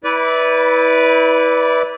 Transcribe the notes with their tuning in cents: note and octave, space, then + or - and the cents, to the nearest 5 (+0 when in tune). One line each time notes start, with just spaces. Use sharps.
E4 -30 B4 +0 D5 -15